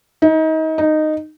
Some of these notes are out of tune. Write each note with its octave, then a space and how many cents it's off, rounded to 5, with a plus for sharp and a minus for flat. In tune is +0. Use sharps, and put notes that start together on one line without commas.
D#4 +30
D#4 -10